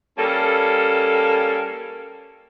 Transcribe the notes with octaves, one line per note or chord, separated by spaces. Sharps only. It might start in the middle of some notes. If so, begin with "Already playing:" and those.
G3 A#3 C#4 A4